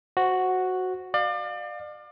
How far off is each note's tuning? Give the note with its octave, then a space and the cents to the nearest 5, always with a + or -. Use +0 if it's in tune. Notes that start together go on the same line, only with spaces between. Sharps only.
F#4 +0 C5 +0
D5 +35 F5 +15